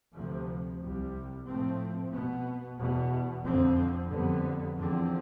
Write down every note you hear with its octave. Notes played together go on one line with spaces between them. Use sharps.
D2 C3 F3
C2 C3 G3
A2 F3 A3 C4
B2 B3
E2 B2 B3
F2 D3 F3 C4
F2 D3 G3 B3
E2 D3 F3 C4